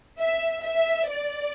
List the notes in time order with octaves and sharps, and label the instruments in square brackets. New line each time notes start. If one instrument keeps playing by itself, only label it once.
[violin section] E5
E5
D5